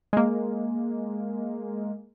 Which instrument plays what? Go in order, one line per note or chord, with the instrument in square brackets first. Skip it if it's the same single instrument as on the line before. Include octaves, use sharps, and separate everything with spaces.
[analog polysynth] G#3 A#3